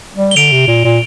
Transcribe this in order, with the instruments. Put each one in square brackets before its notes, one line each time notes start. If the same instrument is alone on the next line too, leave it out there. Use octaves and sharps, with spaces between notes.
[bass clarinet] G3
[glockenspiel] G7
[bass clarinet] D3 [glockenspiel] D7 F7
[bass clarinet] C3
A#2
A#2